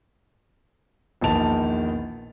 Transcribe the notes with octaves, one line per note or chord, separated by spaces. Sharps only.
A#1 E2 D#3 D#5 A5 F7